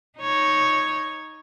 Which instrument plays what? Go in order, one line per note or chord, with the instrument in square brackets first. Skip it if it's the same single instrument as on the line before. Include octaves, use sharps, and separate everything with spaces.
[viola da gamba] D#4 C#5